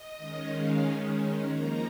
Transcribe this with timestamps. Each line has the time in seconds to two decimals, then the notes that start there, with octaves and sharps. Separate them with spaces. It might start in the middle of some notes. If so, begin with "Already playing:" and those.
Already playing: D#5
0.16 D#3 G#3 C#4
0.49 F5
1.48 F3 A#3 D#4 A#5